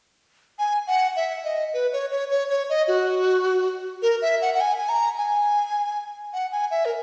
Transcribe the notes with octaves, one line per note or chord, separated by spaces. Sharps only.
G#5
F#5
E5
D#5
B4
C#5
C#5
C#5
C#5
D#5
F#4
A#4
E5
F#5
F#5
G#5
G#5
A#5
G#5
F#5
G#5
E5
A#4